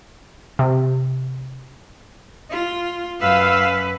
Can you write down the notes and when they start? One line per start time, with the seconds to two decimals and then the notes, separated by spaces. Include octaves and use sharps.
0.59 C3
2.50 F4
3.20 F#2 B4 F5 E6